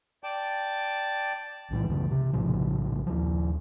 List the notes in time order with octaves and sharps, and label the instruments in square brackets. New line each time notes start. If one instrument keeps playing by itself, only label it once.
[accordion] D5 G5 A5 D6
[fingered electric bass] B1 A2 E3
B1 F#2 C#3 E3
C3
A#1 A2 C#3 F3
D#2 F3